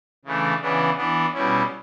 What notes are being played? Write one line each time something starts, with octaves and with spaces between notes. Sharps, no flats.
C#3 E3 A3 D4
C#3 E3 B3 D4
E3 B3 D4
B2 G3 C#4 E4